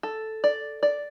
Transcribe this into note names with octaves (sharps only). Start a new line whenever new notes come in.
A4
D5
D5